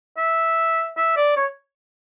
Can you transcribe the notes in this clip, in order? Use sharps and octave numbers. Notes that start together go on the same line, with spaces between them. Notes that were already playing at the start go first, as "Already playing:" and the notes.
E5
E5
D5
C#5